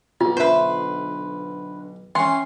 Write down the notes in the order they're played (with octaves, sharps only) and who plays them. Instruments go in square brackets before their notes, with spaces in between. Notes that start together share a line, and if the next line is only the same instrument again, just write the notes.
[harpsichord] B1 [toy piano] F4
[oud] D3 E5 [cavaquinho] B4 C5
[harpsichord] E3 C#4 [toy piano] G5 [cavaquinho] C6